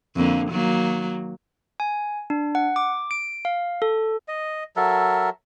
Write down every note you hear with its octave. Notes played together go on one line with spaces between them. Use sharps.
F2 D3 A#3
D#3 F#3 A#3
G#5
D4
F#5
D6
D7
F5
A4
D#5
F#3 A4 A#4 E5